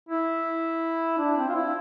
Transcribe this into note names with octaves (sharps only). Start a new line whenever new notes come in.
E4
D4
C4
F4
E4